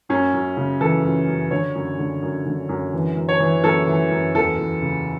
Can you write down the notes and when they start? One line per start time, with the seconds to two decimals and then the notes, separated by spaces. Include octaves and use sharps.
0.09 F#2 C#4
0.34 F#2
0.57 C#3
0.81 E3 A4
1.04 F#2
1.28 F#2
1.51 D3 C#5
1.75 F#2
1.99 D3
2.22 F#2
2.46 D3
2.69 F#2
2.93 E3
3.17 F#2
3.29 C#5
3.40 E3
3.64 F#2 A4
3.87 E3
4.11 F#2
4.34 E2 A4
4.58 E2
4.82 C#3